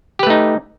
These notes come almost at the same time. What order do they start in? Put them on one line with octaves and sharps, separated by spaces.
G4 B4 A3 D#4